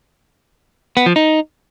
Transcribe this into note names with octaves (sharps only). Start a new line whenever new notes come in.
B3
F3
D#4